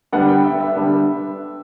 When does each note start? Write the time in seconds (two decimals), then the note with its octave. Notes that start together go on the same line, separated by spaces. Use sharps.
0.12 D3 G3 B3 D4 F#5
0.28 G5
0.44 E5
0.60 E5
0.75 D3 G3 B3 D4